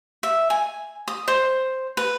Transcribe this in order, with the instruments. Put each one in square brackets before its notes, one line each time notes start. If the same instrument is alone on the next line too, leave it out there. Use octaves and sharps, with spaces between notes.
[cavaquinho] E5
G#5
D#6
C5
B4